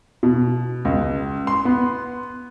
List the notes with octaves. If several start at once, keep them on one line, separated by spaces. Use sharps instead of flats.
B2
C#2
C6
B3